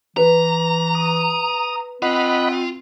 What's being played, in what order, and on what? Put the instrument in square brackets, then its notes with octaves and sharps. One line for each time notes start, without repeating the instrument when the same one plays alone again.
[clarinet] E3 [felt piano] B4 [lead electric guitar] A#5
[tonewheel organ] D#6
[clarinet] C4 [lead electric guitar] F4 [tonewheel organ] D#5 F#5 B5